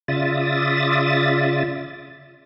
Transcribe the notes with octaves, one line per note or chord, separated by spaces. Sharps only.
C#3 F4 D5 E5 D#6 A6